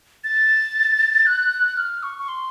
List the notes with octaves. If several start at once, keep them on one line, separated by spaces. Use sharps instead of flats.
A6
F#6
F6
C#6
C#6
C6